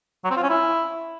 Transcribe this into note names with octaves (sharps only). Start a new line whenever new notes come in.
F#3
C4
F4
C#4
E4